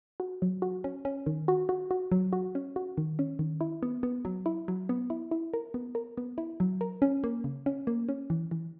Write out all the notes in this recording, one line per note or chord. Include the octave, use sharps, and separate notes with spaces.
F#4
F#3
F#4
C#4
C#4
D#3
F#4
F#4
F#4
F#3
F#4
C#4
F#4
D#3
C#4
D#3
E4
B3
B3
F#3
E4
F#3
B3
E4
E4
A#4
B3
A#4
B3
E4
F#3
A#4
C#4
A#3
C#3
C#4
A#3
C#4
E3
E3